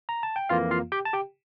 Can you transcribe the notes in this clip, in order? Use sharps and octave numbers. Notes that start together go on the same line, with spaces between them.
A#5
A5
G5
F2 E3 A#3 F4 F5
F4 F5
G4 G5
A5
G4 G5